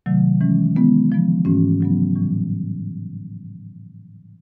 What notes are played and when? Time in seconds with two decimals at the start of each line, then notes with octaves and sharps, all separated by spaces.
0.06 C3 D#3 F#3 A3
0.41 E3 G#3 C#4
0.75 D#3 G#3 B3 E4
1.10 D3 F3 G#3 B3
1.45 G#2 E3 A3 C#4 F#4
1.81 C#3 F#3 B3
2.15 A2 E3 G3